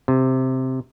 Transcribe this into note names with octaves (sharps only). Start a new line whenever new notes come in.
C3